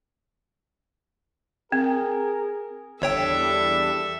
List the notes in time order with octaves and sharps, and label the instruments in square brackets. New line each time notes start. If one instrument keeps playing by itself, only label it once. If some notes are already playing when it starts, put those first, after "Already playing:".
[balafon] C4 [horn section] G#4 A#4
[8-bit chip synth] G1 C#5 G5 [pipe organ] E2 G3 D4 [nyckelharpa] A4 E5